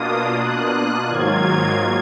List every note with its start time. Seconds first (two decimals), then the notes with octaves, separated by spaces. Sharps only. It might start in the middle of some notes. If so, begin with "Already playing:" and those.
Already playing: B2 A#3 D4 F4 D#6
0.37 F#6
1.09 G#2 D#3 F#3 A#3 F4 G#6